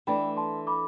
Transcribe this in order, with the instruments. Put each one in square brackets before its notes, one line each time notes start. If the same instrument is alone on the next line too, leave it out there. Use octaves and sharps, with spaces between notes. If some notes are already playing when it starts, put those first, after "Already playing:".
[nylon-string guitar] E3 A3 D4 A4 [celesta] G5 B5
[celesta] A5 C6
B5 D6